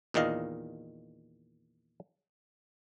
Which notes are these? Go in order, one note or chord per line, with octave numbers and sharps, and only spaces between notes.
E2 A#2 D#3 D#5 F5